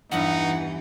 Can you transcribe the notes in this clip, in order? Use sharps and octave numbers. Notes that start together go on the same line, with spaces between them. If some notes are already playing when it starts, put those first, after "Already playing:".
E2 G2 E3 D#4 F#5